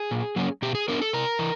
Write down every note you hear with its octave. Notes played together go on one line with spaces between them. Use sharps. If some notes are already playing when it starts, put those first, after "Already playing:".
Already playing: G#4
A#2
F#3 A#3 C#4
B2 G4
G#4
F#3 B3 D4 A#4
A4
C3 A#4
E3